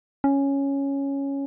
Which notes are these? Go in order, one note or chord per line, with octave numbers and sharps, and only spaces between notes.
C#4